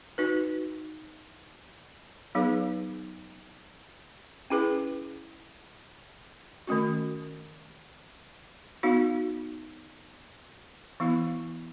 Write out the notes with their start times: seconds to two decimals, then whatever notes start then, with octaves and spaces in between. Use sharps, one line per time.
0.18 D#4 F#4 B4
2.35 F#3 B3 D#4 G#4 B4
4.50 C#4 E4 G#4 B4
6.67 D#3 A3 C#4 F#4
8.83 B3 D#4 F#4
11.00 E3 B3 E4